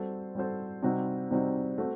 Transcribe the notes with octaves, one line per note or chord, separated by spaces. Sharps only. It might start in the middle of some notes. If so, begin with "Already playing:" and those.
Already playing: G3 C4 F#4 A4 C5
G3 C4 F#4 A4 C5
C3 G3 C4 D#4 F#4
C3 G3 C4 D#4 F#4
A3 C4 F#4